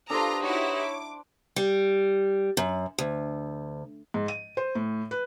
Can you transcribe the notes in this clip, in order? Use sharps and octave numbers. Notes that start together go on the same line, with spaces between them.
D4 F4 G4 A4 B4 C5 A#5 D#6
D#4 E4 F#4 C#5 F#5
D6
G3
F#2
D2
G#2
D#7
C5
A2
B4